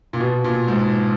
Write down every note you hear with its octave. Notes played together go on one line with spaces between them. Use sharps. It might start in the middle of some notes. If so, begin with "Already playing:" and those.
A#2
B2
A#2
G#2